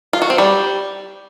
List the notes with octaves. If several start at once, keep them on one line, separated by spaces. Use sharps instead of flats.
F4
F#4
C4
G3